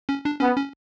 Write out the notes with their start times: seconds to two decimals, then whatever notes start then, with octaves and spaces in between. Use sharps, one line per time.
0.09 C#4
0.25 D4
0.40 B3 C#4
0.56 C#4